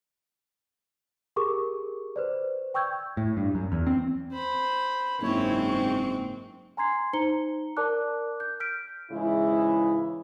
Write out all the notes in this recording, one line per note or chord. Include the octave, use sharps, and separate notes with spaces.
G4 G#4 A#4 C#6 D6
B4 C5 D5
G5 C#6 E6 G6 G#6
A2
G2
F#2
E2
C4
C5 B5
F#1 G#2 C4 E4 C#5
C#6
G#5 A#5 C6 G#6 C7
D#4 C5 A#5 C#7 G7
A#4 D5 A5 D6 F#6
G6
F6 G6 B6 D7
G#2 C#3 E3 G#3 E4